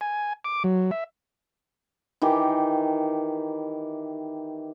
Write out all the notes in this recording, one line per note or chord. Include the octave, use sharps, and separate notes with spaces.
G#5
D6
F#3
E5
D#3 E3 G4